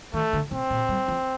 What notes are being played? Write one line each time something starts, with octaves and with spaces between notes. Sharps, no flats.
D#3 A3
D3
C3 C4
A#2
G3
F3